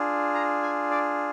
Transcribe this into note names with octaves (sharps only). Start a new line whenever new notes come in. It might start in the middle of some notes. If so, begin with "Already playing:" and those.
Already playing: D4 F4 G#4
A#5
G#5
D5